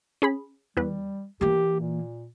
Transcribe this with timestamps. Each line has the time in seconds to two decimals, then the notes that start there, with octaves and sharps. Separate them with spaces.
0.22 C#4 G#4 B5
0.77 E2 G3 B4
1.41 E3 A#3 G4
1.80 A#2